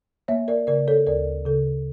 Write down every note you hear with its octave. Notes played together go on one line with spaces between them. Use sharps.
A#3 C#5 E5
A#4 D5
C#3 A#4 D5
A4 C#5
D2 A#4 D5
C#3 A4